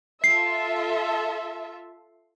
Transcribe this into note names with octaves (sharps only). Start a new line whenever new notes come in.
F4 A4 E5 C7